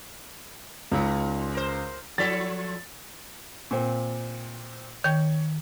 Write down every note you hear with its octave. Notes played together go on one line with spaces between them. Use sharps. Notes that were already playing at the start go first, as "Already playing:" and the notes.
C#2 A#2 D#4
A#4 C5
F3 E4 A4 A6 B6
A#2 C4
D#3 C#5 G5 G6